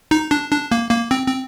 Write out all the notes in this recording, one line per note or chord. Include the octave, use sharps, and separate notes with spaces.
D#4
D4
D4
A#3
A#3
C4
C4